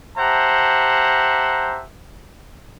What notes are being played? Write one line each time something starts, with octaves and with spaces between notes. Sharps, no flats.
G4 C5 E5 F#5 A5 A#5